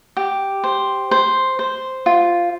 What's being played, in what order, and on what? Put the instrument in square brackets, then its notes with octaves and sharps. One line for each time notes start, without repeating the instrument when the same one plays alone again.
[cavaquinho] G4
C5
C5
C5
F4